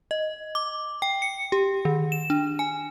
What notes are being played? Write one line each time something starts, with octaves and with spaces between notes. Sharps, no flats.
D#5
D6
G5
C#7
G4
D#3
E7
D4
G#5